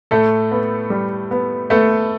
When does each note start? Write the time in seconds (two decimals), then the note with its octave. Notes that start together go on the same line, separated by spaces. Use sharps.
0.11 A2 A3 A4
0.51 B3
0.90 G3
1.31 B3
1.70 A3 B3 A4